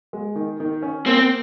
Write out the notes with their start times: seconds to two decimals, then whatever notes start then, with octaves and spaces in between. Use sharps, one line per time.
0.13 G#3
0.36 D#3
0.60 D#3
0.83 C#4
1.06 A#3 C4